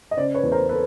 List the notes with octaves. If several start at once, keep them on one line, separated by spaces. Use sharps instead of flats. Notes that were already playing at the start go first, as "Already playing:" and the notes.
D#5
C#3 C5 D5
B4 C#5
E2
A#4 C5
A4 B4